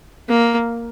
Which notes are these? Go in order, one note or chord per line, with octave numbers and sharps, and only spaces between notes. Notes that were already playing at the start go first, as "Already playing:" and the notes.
A#3